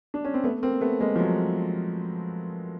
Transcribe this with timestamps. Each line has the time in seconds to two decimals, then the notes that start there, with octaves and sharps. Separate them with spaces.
0.14 D4
0.25 C#4
0.34 C4
0.44 A3 B3
0.63 A#3 C4
0.81 A3 B3
1.01 G#3 A#3
1.16 F3
1.20 F#3